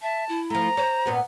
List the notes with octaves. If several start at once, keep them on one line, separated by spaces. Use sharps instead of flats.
E5 A5
E4
F3 A3 A#5
C5 C#5
A#2 B3 F#4